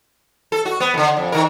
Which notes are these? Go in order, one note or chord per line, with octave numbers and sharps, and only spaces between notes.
A4
F#4
B3
F2 D3
F2
D#3 A#4